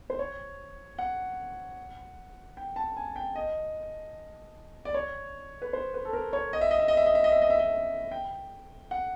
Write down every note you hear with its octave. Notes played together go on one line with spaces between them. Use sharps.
C5
C#5
F#5
G5
A5
G#5
G5
D#5
D5
C#5
B4
C5
B4
A4
A#4
C#5
D#5
E5
D#5
E5
D#5
E5
D#5
E5
D#5
E5
D#5
E5
D#5
G5
F#5